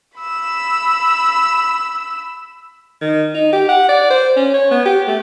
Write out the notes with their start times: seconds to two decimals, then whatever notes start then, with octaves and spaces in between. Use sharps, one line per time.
0.17 B5 E6
3.01 D#3
3.35 D#4
3.53 G4
3.69 F#5
3.89 D5
4.10 C5
4.36 C#4
4.54 C#5
4.71 B3
4.86 G4
5.07 A3